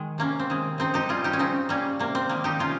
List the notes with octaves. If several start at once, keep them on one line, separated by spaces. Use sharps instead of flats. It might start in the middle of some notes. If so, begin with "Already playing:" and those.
Already playing: D#3 G#3
C3 A#3 C#4
C4
D#3 G#3
C#3 C4 D#4
D#4 G4
G3 F4 G#4
D#4 G4
C#4
C#3 C4 D#4
G3 A#3 C#4
C3 A#3
C4
D#3 G3 A#3
D#4 G4
C3 C#4 F4